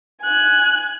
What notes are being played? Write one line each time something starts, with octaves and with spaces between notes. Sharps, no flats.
G#5 F#6